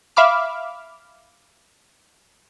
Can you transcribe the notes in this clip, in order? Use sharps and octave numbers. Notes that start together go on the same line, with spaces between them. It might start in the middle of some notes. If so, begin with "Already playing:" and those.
E5 F5 B5 D6 F6